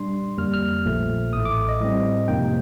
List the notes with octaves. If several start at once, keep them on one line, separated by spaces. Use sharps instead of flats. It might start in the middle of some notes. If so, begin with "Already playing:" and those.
Already playing: A#2 G3 D4 C6
F2 D3 G3 A#3 F6
F6
A#1 A#2 F3 A3
A1 A2 A3 D#6
D6
D#5
A2 G3 C4
F2 C3 F3 A#3 D#4 G5